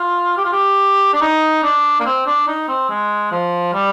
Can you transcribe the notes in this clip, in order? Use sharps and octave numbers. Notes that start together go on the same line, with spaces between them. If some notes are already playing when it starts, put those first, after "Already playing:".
Already playing: F4
G4
F4
G4
D4
D#4
D4
A#3
C4
D4
D#4
C4
G#3
F3
G3